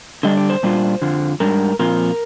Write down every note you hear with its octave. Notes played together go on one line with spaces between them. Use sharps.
D3 G3 D4 D#5
D5
C5
A#2 G3 D4 F4
F2 D3 F3
G#2 G3 D4 A#4
A#2 F3 C4 F4 A#4